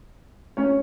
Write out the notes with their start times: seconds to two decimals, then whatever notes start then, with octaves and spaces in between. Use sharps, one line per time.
0.57 C#4 C#5